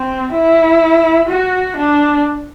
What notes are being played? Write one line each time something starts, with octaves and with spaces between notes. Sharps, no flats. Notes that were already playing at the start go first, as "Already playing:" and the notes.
Already playing: C4
E4
F#4
D4